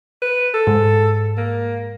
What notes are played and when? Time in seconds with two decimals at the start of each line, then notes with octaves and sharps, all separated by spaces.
0.22 B4
0.54 A4
0.67 G#2
1.38 A#3